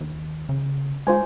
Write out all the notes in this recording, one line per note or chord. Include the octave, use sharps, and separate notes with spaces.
D#2
C#3
G#3 F4 C5 G#5